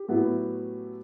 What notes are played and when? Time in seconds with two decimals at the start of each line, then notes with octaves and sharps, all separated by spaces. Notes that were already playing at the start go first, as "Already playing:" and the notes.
Already playing: G4
0.08 A2 F#3 B3 E4